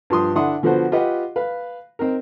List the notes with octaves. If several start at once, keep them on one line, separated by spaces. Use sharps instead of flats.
G2 F3 C6 D#6
D3 D4 E4 F#5 C6 D#6
D3 F3 B3 F#4 C5
F4 G4 B4 D#5 F#5
B4 F5
C4 D#4 A#4